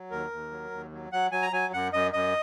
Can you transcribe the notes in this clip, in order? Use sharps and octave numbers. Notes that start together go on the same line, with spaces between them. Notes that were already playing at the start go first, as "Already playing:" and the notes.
Already playing: F#3
D#2 A#4
D#2
F#3
D#2
F#3
F#3 F#5
F#3 G#5
A#5
F#3 G#5
F#2 F#5
F#2 D#5
F#2 D#5